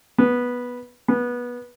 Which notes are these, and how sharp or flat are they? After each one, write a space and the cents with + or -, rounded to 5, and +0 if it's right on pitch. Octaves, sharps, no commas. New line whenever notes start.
B3 -10
B3 -20